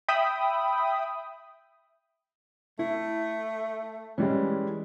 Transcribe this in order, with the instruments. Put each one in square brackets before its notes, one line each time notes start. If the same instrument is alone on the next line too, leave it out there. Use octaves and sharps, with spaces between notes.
[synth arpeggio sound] E5 G5 B5 D#6
[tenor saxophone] A3 [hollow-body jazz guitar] E4
[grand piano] E3 G3 G#3 [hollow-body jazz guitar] C#4